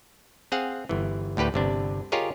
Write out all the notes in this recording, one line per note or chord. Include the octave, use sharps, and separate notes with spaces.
C4 G#4 F5 F#5
G1 E3
D2 A2 G4 B4 G5
G1 C3 D4
F4 G4 G#4 A#4 C#5 D#5